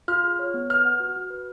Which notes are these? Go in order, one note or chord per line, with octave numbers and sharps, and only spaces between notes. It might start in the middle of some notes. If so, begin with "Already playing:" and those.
F4 F6
G#4
C#5
B3
B4 F6
F#5
F#4
F#4
B4